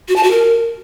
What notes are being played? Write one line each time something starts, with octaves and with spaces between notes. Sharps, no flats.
F#4
A5
F#4
A#4